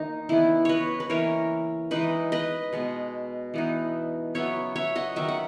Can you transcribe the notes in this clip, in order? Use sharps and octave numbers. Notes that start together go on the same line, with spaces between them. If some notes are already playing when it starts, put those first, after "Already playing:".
Already playing: D#3 A#3 D#4
C#3 E3 B3 E4
B4 C#5 D#5
B4
E3 A#3 C#4 A#4 C#5
E3 G#3 D#4 B4 D#5
B4 D#5
B2 G#3 B3
E3 B3 D#4
C#3 F#3 B3 C#5 E5
C#5 E5
D#5 F#5
D#3 F#3 C#4 E5
F#5